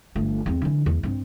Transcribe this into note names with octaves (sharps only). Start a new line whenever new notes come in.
G1 A3
E2 C4
D3 E3
E2
G2 C4